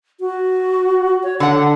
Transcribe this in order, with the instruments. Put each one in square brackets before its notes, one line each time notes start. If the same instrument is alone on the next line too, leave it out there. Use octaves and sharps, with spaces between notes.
[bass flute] F#4
C#5
[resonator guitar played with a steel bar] D3 F#5 [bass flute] D4